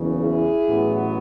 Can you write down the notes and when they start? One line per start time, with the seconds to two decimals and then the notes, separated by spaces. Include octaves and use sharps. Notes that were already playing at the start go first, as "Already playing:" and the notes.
Already playing: F#1 E2 C#3
0.20 E4 G#4
0.66 A1 A2 F#3 B3